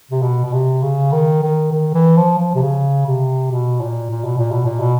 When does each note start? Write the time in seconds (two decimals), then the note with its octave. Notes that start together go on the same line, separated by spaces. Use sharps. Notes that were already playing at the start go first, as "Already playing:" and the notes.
0.11 C3
0.22 B2
0.45 B2
0.53 C3
0.82 C#3
1.12 D#3
1.43 D#3
1.72 D#3
1.95 E3
2.17 F3
2.39 F3
2.55 C3
2.62 C#3
3.07 C3
3.51 B2
3.81 A#2
4.11 A#2
4.25 B2
4.38 A#2
4.52 B2
4.66 A#2
4.80 B2